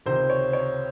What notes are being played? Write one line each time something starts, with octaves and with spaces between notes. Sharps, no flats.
C#2 C3 D#3 C5
C#5
C#5